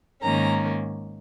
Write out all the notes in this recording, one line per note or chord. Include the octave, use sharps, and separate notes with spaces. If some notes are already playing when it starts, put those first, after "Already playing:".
G#2 D#3 A#3 C#4 A#5